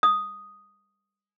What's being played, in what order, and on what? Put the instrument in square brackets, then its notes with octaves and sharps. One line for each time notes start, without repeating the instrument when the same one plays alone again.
[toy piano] D#6